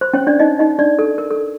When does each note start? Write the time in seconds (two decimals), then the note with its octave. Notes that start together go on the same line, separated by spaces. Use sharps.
0.01 C5
0.14 C#4 C#5
0.27 D4 D5
0.40 D#4 D#5
0.59 D#4 D#5
0.78 D4 D5
0.99 A4
1.18 A#4
1.30 A4